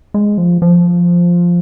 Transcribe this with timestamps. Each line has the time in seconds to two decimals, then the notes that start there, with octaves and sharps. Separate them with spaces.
0.14 G#3
0.38 F3
0.62 F3